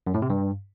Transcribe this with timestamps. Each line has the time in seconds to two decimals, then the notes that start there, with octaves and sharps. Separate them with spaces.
0.07 F#2
0.14 A2
0.22 C3
0.30 G2